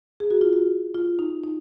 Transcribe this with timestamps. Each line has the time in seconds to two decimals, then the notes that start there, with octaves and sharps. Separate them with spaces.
0.20 G#4
0.31 F#4
0.41 F4
0.53 F#4
0.95 F4
1.19 D#4
1.44 D#4